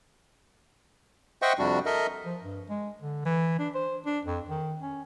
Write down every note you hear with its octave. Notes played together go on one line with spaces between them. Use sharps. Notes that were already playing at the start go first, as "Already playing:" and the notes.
C5 D#5 E5 F#5 G5 C#6
F2 C3 G3 D4 F#4
A4 A#4 D#5 E5
F3
G2
G#3
D3
E3
D4
C5
D4
F2
D#3
C#4